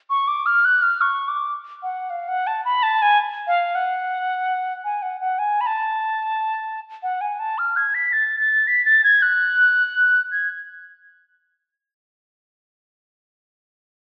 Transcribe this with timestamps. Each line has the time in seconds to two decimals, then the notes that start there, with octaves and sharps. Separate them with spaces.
0.10 C#6
0.28 D6
0.46 F6
0.65 F#6
0.82 F6
1.01 C#6
1.28 D6
1.83 F#5
2.10 F5
2.28 F#5
2.47 A5
2.65 B5
2.83 A5
3.02 G#5
3.47 F5
3.75 F#5
4.84 G#5
5.02 F#5
5.21 F#5
5.39 G#5
5.61 B5
5.67 A5
7.03 F#5
7.21 G#5
7.39 A5
7.58 F6
7.76 G#6
7.95 B6
8.13 A6
8.40 A6
8.67 B6
8.85 A6
9.04 G#6
9.22 F#6
10.32 G#6